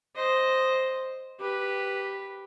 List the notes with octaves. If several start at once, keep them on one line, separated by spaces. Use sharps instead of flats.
C5 D#5
G4 B4